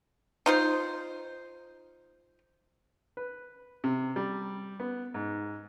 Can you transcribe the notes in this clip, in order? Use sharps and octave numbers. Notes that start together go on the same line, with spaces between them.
D#4 F4 C5
B4
C3
G3
B3
G#2